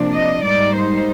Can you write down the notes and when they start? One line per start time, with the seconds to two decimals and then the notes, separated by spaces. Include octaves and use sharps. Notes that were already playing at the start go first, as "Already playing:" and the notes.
Already playing: C3 F3 A#3 D4
0.14 D#5
0.45 G#2 G3 A#3 D#4 D5
0.77 C5